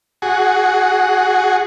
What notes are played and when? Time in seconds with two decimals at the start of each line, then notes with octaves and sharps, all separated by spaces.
0.22 F#4 G#4